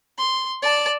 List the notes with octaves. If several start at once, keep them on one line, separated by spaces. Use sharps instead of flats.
C6
D5 A5